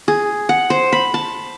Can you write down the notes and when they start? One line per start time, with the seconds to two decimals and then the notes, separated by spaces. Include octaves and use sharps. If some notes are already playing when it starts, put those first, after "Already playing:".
0.08 G#4
0.49 F#5
0.70 C5
0.92 B5
1.14 A5